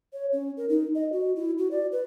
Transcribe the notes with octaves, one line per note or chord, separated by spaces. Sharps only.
C#5
C#4
A#4
D#4
D#5
F#4
E4
F#4
D5
B4